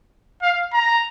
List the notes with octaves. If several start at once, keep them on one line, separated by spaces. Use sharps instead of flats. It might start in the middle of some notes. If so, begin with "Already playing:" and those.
F5
A#5